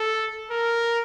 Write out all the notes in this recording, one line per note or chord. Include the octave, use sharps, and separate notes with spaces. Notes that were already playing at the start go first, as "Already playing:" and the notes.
Already playing: A4
A#4